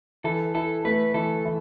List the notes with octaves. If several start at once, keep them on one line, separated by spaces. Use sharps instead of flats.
E3 A4
E4 A4
A3 B4
E3 A4
E3